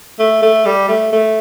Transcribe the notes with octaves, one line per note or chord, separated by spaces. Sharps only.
A3
A3
G3
A3
A3